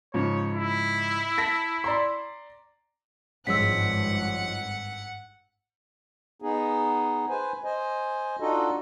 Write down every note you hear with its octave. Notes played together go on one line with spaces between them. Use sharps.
G#2 C#3 F3 C#5
E4
A5 A#6 B6
D5 A#5 C6
G#1 G2 F3 G#3 C#4 F#5 E6 B6
B3 D#4 G#4
B4 C5 G#5
C5 D#5 G#5
D4 D#4 F4 F#4 A4 D#5